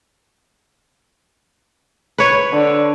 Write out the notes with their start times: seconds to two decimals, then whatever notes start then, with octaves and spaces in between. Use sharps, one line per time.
2.18 B4 C#5
2.53 D3